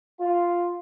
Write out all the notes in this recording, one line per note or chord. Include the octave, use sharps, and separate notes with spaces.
F4